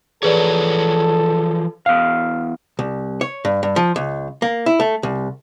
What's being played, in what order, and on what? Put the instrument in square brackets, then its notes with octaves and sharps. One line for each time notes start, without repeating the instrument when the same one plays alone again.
[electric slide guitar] E3 F3 C#5 [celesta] G#4 B4 D5 [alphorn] A4
[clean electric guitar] E2 F5 [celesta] F6
[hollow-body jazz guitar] C2
C#5
G2
G2
F3
C#2
A#3
E4
A3
C2